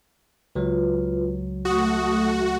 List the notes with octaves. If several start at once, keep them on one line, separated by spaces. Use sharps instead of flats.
C#2 F#3 F4 B4
A3 F#4 C#6 D#6